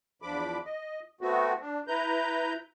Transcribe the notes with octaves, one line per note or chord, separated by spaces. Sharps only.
E2 F3 D4 B5 D6
D#5
A3 B3 C4 F#4
D4
E4 B4 A#5 G6